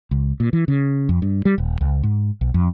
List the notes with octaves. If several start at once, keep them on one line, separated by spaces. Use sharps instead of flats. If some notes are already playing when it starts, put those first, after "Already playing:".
C#2
A#2
E3
C#3
F2
G2
G3
D#1
C#2
G#2
B1
F2